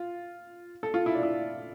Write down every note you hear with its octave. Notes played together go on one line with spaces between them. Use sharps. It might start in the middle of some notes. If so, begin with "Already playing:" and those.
Already playing: F4
A4
F4
E4
D4
E4